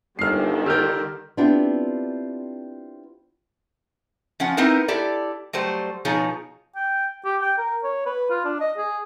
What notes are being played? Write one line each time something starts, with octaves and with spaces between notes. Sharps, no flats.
G1 D3 D#3 G3 F6 C7
G4 A#4 E6 F6 G6
B3 C4 D4 E4 F4 G4
F3 C#4 F4 F#5
B3 C4 D#4 E4 A#4
E4 G4 A4 D5
F#3 G3 A3 C5
B2 F3 D#4 G#4 C#5
G5
G4
G5
A#4
C#5
B4
F4
D4
D#5
G#4